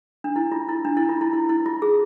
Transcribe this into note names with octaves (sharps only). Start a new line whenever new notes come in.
D4
E4
F4
E4
D4
E4
F4
E4
E4
E4
F4
G#4